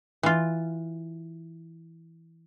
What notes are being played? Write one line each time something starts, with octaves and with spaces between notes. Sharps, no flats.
E3 F4